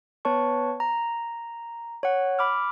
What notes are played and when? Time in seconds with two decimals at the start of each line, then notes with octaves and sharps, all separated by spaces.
0.25 B3 B4 C#5 A5 C#6
0.80 A#5
2.03 C#5 F#5
2.39 B5 D6 F6